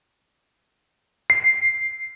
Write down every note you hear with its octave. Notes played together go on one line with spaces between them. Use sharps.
C7